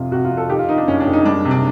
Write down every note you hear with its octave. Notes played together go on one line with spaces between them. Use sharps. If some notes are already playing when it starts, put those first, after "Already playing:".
Already playing: F2 C3 F4
C3 F#4
F4
F2
A4
D#3 G4
F4
D#3 D#4
D4
F#1 C#4
D4
F#1
D#4
G3 D4
C3
D4